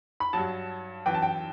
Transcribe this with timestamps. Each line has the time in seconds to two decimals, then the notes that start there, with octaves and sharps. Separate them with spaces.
0.20 B5
0.33 G2 F#3 A5
1.06 F#2 E3 G5
1.14 A5
1.22 G5